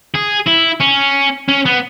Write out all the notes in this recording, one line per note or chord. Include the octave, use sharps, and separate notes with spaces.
G#4
E4
C#4
C#4
B3